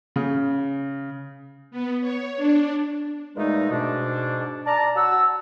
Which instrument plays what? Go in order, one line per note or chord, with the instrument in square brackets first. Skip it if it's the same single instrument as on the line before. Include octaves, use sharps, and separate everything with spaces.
[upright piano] C#3
[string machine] B3
C#5
D4
[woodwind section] E2 A#2 G#3 A3 D#4
G#2 B2 D4
D5 A5 A#5
F#4 F#5 A5 E6